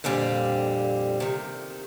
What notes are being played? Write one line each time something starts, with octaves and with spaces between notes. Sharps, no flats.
F2 A#2 D3 G3 C4
C3 D#3